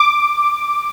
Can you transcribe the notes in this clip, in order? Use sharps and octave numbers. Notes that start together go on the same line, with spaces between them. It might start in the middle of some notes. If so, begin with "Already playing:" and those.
Already playing: D6